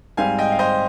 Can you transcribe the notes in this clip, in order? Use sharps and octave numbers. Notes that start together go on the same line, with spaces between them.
G#2 G3 C4 F5 G#5
D#5 G5
F5
C5 D#5